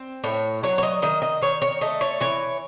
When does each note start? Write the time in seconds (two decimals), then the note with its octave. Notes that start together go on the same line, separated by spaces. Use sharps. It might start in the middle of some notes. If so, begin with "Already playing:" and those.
Already playing: C4
0.24 A2 C#5
0.63 F#3 C#5
0.78 C#5
0.83 D#5
1.02 D#3 D#5
1.22 D#5
1.42 D#3 C#5
1.62 C#5
1.81 A3 D#5
2.01 C#5
2.21 E3 C#5